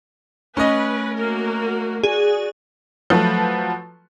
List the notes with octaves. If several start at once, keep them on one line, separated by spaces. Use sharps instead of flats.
A3 C#4 B4 D#5
A#3 F#4 A#4
F#4 G#4 D5
F3 F#3 A3 F#4 B4